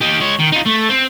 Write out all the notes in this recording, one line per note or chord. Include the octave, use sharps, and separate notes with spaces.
D#4 G4
G#3 C#5
D#3
D#4 F4
A3
C4